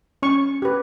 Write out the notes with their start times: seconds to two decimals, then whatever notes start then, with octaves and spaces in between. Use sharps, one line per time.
0.23 C#4 C#6
0.62 G4 B4